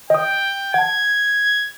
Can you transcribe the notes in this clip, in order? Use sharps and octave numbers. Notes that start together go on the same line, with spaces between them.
D#5 G5 D#6
F#5 A5 G#6